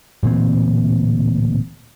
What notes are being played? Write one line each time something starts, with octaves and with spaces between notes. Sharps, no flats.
D1 A#2 E3 C4